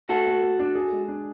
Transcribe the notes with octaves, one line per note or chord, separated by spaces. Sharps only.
A3 F#4 A4
A3
A3
D4
G#4
G#3
D4